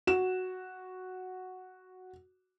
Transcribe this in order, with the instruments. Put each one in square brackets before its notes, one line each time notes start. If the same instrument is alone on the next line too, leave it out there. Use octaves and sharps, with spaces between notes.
[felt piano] F#4 E7